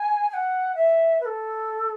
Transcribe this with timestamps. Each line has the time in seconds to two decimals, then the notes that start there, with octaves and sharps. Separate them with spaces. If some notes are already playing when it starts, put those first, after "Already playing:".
Already playing: G#5
0.29 G#5
0.34 F#5
0.75 E5
1.21 B4
1.25 A4